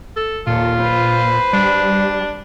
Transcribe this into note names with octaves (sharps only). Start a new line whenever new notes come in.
A4
D#2 A#2 F4 A4
B4 C5
G3 D4